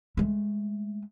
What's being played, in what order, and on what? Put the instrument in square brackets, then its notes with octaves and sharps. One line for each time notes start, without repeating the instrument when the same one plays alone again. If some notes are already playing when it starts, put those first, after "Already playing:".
[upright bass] G#3 A3